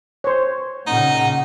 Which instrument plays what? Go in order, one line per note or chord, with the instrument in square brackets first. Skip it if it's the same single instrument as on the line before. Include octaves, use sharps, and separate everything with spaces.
[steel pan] C5 C#5
[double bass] A#2 C#3 [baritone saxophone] D#4 [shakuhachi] F#5